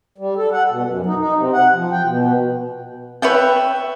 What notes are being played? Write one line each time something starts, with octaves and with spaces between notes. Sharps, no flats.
G3
A4
F#5
B2
F#2
D#4
D#4
C3
F#5
F3
G5
B2
B4 C#5 E5 G5